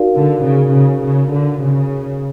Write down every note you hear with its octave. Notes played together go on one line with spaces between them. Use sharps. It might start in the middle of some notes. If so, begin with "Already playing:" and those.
Already playing: D#4 F#4 A#4 D5 F5
D3
C#3
C#3
C#3
D3
C#3